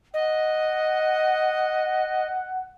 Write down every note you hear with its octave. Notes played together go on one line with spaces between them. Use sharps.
D#5 F#5